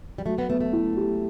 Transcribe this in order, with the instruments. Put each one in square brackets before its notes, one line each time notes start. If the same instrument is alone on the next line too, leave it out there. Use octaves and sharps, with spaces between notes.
[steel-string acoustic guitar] G3
[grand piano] F#3 [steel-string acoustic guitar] A3
[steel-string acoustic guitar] B3
[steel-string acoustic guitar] A3 [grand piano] B3
[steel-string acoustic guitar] A3
[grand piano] E4
G4